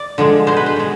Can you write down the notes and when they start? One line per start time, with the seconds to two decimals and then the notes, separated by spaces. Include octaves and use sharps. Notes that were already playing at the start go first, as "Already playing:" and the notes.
Already playing: D5
0.18 D3 F3 G#3
0.47 B2 G#3 C5
0.57 B4
0.66 C5
0.76 B2 G#3